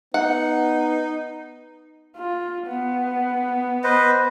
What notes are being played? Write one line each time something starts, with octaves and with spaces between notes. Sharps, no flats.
B3 D#4 F#5
F4
B3
B4 C5 D#5